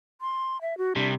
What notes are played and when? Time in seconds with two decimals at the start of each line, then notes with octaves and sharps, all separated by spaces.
0.21 C6
0.61 E5
0.78 F#4
0.96 C3 G3 D4